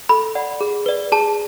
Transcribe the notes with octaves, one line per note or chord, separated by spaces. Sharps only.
A4 B5
D5 F#5
G#4
B4 D5
G#4 A5